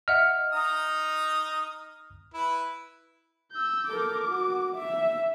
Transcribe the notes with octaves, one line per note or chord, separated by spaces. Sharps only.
D#5 E5 F#5 F6
D#4 A#5 D#6
E4 B4
E6 G6
A4 A#4 D6
F#4
E5